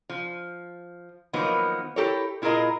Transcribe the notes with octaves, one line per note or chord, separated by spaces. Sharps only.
F3
D#3 F3 F#3 A#3 B3
E4 G4 A4 A#4 C#5
A#2 E4 F4 G#4 A#4 D#5